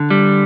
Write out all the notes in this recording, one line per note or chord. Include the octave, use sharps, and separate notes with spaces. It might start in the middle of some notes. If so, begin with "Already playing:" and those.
Already playing: D3
G3